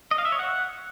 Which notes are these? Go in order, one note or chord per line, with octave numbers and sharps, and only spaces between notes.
D#5
F5
E5
C#5
F#5